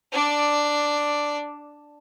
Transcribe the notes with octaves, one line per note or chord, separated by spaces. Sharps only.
D4 D5